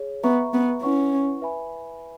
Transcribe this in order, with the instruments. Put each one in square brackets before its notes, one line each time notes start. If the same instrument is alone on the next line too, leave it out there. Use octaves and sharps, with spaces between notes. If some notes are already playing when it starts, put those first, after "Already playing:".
Already playing: [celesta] G#4 C#5
[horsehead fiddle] B3 [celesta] B4 E5 A#5 C#6
[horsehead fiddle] B3
[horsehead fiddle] C#4 [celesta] E4 B4 F#5 C#6
[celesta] B4 E5 G#5 B5